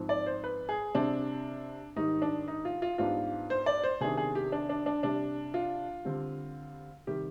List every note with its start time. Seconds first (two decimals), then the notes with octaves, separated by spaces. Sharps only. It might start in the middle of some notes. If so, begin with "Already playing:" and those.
Already playing: G#2 F3 C4
0.09 D5
0.26 C5
0.44 B4
0.69 G#4
0.94 C3 G3 C4 D4
1.96 G#2 D#3 G3 D#4
2.22 D4
2.48 D#4
2.65 F4
2.82 F4
2.98 G#2 G3 B3 D4 F4
3.50 C5
3.66 D5
3.84 C5
4.01 C3 D#3 G3 B3 D4 G#4
4.17 G#4
4.35 G4
4.52 D4
4.69 D4
4.86 D4
5.03 C3 G3 D4
5.54 F4
6.05 D3 G3 C4
7.07 C3 D#3 G3 G4